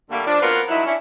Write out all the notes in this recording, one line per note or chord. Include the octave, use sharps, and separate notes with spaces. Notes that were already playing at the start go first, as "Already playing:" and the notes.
D3 G3 A3 A#3
F3 D4
F#3 B3 C4 F4 A#4 B4
G2 F#3 D#4 E4
C#4 D4 E4